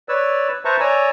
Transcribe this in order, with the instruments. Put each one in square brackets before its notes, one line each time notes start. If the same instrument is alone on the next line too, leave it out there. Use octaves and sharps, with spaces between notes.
[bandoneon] B4 C#5 D5 E6
B4 C5 E5 A5 A#5 C#6
C#5 D5 G#5 A#5 E6